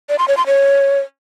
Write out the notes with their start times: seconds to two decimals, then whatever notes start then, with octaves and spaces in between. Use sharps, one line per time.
0.09 D5
0.19 C6
0.28 C#5
0.37 C6
0.47 C#5